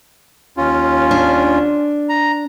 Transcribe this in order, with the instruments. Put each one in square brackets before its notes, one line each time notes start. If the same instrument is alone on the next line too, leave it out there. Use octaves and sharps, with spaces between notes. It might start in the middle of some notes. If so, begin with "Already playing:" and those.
[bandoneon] D#2 C#4 F4
[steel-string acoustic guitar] D4
[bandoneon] A#5